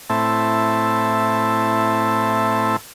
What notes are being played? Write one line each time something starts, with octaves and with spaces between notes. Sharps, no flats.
A2 C4 E4 A5